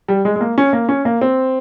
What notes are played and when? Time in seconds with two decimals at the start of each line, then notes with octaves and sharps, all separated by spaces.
0.08 G3
0.25 G#3
0.36 G#3
0.41 A#3
0.58 C#4
0.73 A#3
0.89 C#4
1.05 A#3
1.21 C4